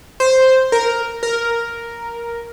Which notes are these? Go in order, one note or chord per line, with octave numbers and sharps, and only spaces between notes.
C5
A#4
A#4